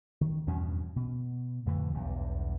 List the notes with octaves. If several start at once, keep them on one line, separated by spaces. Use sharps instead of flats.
D#3
E2 G2 B2 C#4
B2
F2 A2 D3 E3
B1 E2 G2